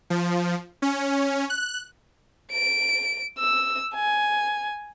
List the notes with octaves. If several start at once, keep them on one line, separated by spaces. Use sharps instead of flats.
F3
C#4
F#6
D7
E6
G#5